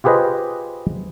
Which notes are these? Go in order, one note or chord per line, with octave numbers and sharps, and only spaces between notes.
F4 G4 G#4 B4 C5 D#5